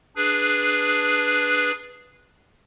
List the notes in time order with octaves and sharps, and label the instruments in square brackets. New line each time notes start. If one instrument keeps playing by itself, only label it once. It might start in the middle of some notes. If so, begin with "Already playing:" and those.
[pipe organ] D4 G#4 B4